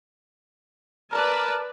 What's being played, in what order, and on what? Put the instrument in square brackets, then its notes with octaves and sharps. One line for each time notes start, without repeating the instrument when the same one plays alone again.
[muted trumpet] A#4 [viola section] B4 D5 A5